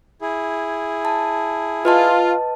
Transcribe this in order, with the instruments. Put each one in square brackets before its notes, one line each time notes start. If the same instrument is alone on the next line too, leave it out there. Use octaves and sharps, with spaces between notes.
[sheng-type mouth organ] E4 G#4
[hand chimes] A5
[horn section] F4 [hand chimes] B4 D#5 A5